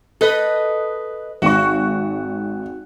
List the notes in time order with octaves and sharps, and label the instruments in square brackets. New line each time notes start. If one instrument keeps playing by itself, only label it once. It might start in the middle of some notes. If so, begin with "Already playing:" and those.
[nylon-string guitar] A4 [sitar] B4 D#5
[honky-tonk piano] G#1 C#6 [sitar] F#4